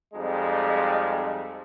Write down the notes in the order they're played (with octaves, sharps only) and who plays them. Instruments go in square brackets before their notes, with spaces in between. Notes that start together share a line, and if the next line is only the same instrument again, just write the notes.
[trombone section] F2 F3 G3 G#3 D#4